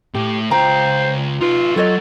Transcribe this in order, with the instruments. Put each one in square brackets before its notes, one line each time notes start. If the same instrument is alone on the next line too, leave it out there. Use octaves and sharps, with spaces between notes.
[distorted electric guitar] A2 [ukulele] G4
[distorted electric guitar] C#2 F5 [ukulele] F4 G5 A#5 [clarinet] C5
[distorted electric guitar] D#4 B4 [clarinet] F4
[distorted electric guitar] F#3 [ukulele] F4 C#5 D#5 [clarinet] A4